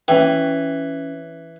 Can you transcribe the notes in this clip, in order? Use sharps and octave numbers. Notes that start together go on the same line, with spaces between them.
E3 C#4 G5